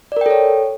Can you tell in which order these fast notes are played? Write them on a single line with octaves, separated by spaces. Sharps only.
D5 A#4 G5 A4 C#5